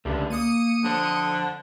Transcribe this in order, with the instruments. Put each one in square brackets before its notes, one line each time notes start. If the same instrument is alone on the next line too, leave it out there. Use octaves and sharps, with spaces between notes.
[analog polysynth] C#2 D3 [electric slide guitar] A3 D4 G4
[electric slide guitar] A#3 [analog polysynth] D#6 C#7 D#7
[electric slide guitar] F2 C5 [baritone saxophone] D3